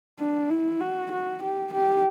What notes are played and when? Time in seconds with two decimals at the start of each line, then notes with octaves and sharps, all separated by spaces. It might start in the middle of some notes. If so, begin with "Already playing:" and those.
0.19 D4
0.50 E4
0.81 F#4
1.12 F#4
1.43 G4
1.73 G4